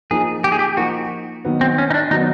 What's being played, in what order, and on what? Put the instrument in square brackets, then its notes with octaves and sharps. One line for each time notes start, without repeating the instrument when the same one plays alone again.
[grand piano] F3 A#3 D#4 [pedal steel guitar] G#4
[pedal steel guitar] G4
G#4
G4
[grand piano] F3 A#3 D#4 [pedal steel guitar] F#4
[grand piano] D#3 F#3 B3
[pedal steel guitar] C4
C#4
D#4
D4
[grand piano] D#3 F#3 B3 [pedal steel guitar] D#4